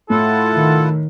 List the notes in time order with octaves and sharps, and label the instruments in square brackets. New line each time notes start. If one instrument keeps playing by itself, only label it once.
[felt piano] A2 [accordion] E4 F4 F#5 [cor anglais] A4
[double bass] D#3